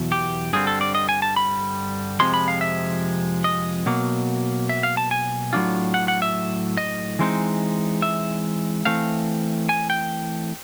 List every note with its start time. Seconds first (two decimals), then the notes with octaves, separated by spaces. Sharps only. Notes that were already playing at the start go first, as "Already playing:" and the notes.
Already playing: E2 B2 F#3
0.12 G4
0.53 G2 D3 G3 C4 G#4
0.67 A4
0.81 D5
0.95 D#5
1.09 G#5
1.22 A5
1.36 B5
2.20 F2 C3 F3 G#3 C6
2.34 B5
2.48 F5
2.61 E5
3.44 D#5
3.86 B2 F#3 A#3
4.69 E5
4.83 F5
4.97 A5
5.11 G#5
5.53 A2 F#3 A3 D4 F4
5.94 F#5
6.08 F#5
6.22 E5
6.77 D#5
7.19 E3 G#3 C4 D#4
8.02 E5
8.85 E3 A3 C4 F5
9.69 G#5
9.90 G5